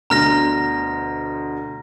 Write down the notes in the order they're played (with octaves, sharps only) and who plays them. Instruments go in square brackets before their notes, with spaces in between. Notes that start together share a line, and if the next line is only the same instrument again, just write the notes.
[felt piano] D2 B2 D3 [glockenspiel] A#5 F6 A#6